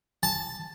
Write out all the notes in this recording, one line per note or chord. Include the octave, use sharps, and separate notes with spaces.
A5